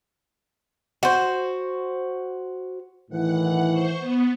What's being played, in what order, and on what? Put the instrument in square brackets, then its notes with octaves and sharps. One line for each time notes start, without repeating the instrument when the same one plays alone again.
[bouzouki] F#4 C5
[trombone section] A2 D#3 E3 [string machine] F#5
[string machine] C5 C#6
B3